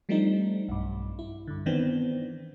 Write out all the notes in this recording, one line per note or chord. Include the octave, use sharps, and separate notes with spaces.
F3 G3 A3 C4 D4 D#4
B1 G2
E4
G2 D3
D#3 E3 B3 C4 D4